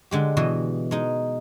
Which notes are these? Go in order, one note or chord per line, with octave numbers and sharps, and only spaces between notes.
D3 G#3 G4
B2 E3 D#5
G#3 D#4